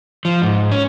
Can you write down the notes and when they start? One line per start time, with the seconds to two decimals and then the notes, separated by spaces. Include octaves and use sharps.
0.25 F3
0.42 G#2
0.72 C#4